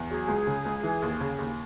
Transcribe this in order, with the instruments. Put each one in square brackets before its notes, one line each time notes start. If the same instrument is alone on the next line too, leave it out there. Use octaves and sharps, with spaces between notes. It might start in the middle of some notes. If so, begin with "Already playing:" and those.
Already playing: [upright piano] E2
[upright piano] F#3 [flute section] G#4
[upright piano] C#2
C#3
C#2
E3
D#2
C#3
D#2